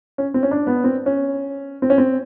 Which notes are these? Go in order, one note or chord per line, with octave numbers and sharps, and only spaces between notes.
C#4
C4
C#4
D4
B3
C4
C#4
C4
C#4
C4